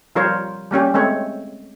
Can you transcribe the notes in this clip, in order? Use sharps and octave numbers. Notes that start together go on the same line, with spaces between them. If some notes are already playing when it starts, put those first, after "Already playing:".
F3 G3 F4 A#4 C5 C#5
G3 A#3 C#4 G4
G#3 A3 C4 C#5